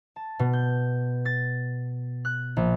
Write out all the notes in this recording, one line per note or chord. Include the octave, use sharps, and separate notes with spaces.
A5
B2
G6
A6
F#6
A#1